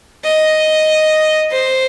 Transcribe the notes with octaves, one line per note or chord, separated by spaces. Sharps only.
D#5
C5